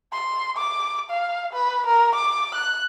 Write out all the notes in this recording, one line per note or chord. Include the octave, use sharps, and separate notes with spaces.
C6
D6
F5
B4
A#4
D6
F#6